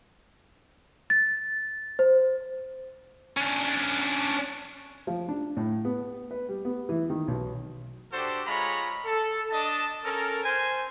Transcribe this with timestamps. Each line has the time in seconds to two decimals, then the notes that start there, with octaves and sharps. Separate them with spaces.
1.10 A6
1.99 C5
3.37 C#4 D4
5.07 F3
5.29 D4
5.57 A2
5.85 B3
6.31 B4
6.49 G3
6.65 B3
6.89 E3
7.10 D#3
7.28 B1
8.12 D4 F#4 G4 A4 C5
8.46 G#3 F4 C#5 A#5 B5
9.05 A4
9.50 D4 D#5 A5
10.04 C#4 A4 A#4
10.44 C5 G#5